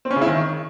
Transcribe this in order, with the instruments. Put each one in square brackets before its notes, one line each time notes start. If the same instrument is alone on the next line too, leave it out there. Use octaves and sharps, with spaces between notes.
[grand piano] C4
C#4
C#3
E4
D#3